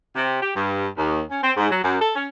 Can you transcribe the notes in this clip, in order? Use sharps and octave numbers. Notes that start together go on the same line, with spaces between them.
C3
G4
G2
D#2
C#4
C4
G#2
F#3
F#2
A4
C#4